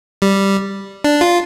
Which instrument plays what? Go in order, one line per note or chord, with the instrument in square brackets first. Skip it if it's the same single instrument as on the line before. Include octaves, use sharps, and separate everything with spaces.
[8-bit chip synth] G3
D4
F4